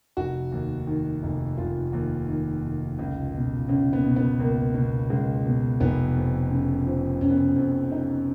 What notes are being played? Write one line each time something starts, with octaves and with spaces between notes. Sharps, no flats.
F1 F#4
D#2
D#3
F1
F1 F4
D#2
D#3
F1
C#2
B2
C#2 C#4
B3
B2
B3
C#2 A#3
B2
C#2 G#3
B2
F1 B3
F2
C#3
F3
F1 C#4
B3
C#4
F2
C#3 D#4